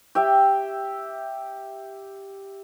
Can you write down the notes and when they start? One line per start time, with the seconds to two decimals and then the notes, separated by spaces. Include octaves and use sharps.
0.15 G4 E5 G5